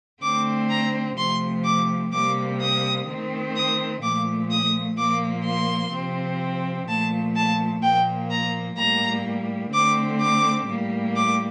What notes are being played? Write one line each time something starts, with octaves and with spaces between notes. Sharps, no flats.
D3 A3 C4 D6
A#5
C3 F3 A3 C6
D6
C3 G3 A#3 D6
D#6
D#3 A3 C4
D#6
A#2 F3 A3 D6
D#6
A#2 F3 A#3 D6
C6
C3 F3 C4
A#2 F3 A3 A5
A5
A#2 F3 A#3 G5
A#5
A2 G3 A#3 A#5
D3 A3 C4 D6
D6
A2 G3 A#3
D6